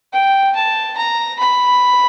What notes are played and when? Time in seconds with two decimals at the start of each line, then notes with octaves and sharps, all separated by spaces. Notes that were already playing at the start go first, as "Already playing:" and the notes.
0.13 G5
0.56 A5
0.98 A#5
1.39 B5